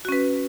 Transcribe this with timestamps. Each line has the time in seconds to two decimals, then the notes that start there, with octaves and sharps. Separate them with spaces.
0.05 F#4
0.09 C#4
0.12 B4